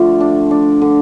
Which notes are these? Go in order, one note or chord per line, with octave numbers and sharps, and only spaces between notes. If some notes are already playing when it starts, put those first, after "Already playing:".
Already playing: D3 F3 A3 F4
D4
D4
D3